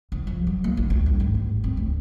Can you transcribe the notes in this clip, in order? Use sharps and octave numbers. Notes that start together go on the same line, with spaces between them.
C2
F3
F#3
A#3
B1
D2
G2
G#1
A1
C4
D2